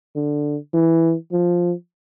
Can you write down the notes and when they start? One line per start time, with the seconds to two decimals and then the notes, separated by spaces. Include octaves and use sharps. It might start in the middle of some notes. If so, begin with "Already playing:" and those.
0.16 D3
0.74 E3
1.32 F3